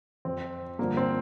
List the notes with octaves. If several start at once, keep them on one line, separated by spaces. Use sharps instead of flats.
F2 F3 C4
G2 D3 F3 A#3
C4